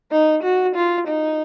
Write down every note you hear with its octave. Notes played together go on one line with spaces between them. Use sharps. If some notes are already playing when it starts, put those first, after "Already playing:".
D#4
F#4
F4
D#4